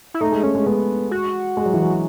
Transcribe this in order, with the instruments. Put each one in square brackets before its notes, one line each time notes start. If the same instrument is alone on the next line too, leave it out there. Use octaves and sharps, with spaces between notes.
[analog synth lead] E4
[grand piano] A3 [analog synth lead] D#4
[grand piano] G#3
[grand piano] A3 [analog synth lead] C#4
[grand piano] G#3
[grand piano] G#3 [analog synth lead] B3
[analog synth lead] F#4
[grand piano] G#3
F#3
E3
F#3